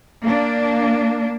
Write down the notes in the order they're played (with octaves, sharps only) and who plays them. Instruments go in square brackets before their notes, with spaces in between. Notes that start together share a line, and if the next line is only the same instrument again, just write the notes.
[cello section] A#3 D4